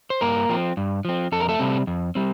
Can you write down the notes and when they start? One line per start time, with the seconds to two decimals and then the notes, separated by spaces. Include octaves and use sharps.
0.10 C5
0.21 G2 A#3 A#4
0.49 F3 C4
0.77 G2
1.05 F3 C4
1.32 F2 A4
1.40 A#4
1.49 A3 A4
1.59 C3 G3 C4
1.87 F2
2.15 G3 C4